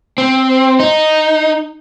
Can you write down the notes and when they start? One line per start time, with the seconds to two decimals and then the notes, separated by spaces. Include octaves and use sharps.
0.18 C4
0.80 D#4